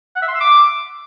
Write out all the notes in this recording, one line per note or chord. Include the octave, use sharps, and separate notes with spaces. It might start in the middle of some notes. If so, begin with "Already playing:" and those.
F#5
E5
C6
E6
D6